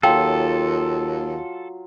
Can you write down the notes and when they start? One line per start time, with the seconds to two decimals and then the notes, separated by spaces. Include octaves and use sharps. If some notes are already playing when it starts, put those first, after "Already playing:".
0.03 D#2 F#3 F4 A4 F5 G5 G#5